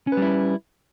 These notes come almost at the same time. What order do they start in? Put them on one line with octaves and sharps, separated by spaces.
C#4 B4 G3 E4